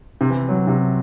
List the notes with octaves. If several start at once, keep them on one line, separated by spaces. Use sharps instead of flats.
C3
E3
F#3
C3